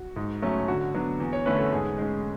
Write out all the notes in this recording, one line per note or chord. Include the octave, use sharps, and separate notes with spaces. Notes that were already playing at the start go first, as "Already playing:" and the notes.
Already playing: F#4
G#2
F#3 A3 C#4
D3 F#4
F#3 B3 D4
E2
C#5
D3 A3 C#4 B4
A4
G#2 G#4
G#3 C#4